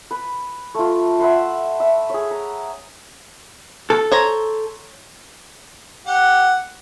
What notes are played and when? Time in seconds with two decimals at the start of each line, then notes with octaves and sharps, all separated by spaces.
0.11 B4
0.74 A3 F4
1.20 E5 F#5 B5 C6
1.80 E5
2.10 G#4 C#5
2.31 A#5
3.90 A4
4.12 C5 C#5 A#5
6.07 G4 F#5